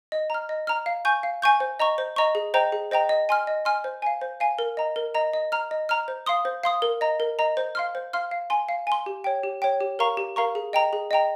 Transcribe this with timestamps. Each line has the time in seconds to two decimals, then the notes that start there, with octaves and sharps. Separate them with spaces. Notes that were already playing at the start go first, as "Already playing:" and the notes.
0.12 D#5
0.30 A#5 F6
0.49 D#5
0.67 A#5 F6
0.86 F5
1.05 G#5 C#6 G6
1.23 F5
1.42 G#5 C#6 G6
1.60 C5
1.80 D#5 A#5 C#6
1.98 C5
2.16 D#5 A#5 C#6
2.35 G#4
2.54 C5 D#5 G5 A#5
2.72 G#4
2.91 C5 D#5 G5 A#5
3.09 D#5
3.29 G#5 C6 F6
3.47 D#5
3.65 G#5 C6 F6
3.84 C5
4.02 F5 G#5
4.21 C5
4.40 F5 G#5
4.59 A#4
4.77 D#5 A#5
4.96 A#4
5.15 D#5 A#5
5.33 D#5
5.52 A#5 F6
5.71 D#5
5.89 A#5 F6
6.08 C5
6.26 F5 C6 D#6
6.45 C5
6.64 F5 C6 D#6
6.82 A#4
7.01 D#5 A#5
7.20 A#4
7.39 D#5 A#5
7.57 C5
7.75 F5 C6 F6
7.95 C5
8.13 F5 C6 F6
8.31 F5
8.50 G#5 C6
8.69 F5
8.87 G#5 C6
9.06 G4
9.24 C#5 G5
9.43 G4
9.62 C#5 G5
9.81 G4
9.99 A#4 F5 A#5 C#6
10.17 G4
10.36 A#4 F5 A#5 C#6
10.55 G#4
10.73 D#5 G5 A#5
10.93 G#4
11.11 D#5 G5 A#5